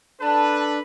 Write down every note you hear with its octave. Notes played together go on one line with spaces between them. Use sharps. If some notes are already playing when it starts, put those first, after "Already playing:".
D4 A4 B4 A5